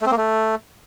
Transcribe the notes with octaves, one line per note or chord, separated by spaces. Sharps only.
A3
C4
A#3
A3